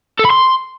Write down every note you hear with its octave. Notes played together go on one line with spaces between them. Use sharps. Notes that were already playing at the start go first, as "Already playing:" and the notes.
A4
B5
C6